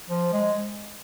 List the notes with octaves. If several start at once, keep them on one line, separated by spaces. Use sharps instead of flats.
F3
G#3